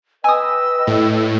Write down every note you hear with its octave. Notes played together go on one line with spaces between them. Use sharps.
B4 D#5 G5 G#5 D#6 E6
A2